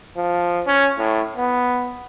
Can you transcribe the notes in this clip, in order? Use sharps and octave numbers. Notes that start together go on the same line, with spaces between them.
F3
C#4
A2
B3